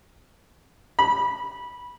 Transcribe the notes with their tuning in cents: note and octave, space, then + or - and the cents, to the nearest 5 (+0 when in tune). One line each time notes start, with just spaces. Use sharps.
B5 -15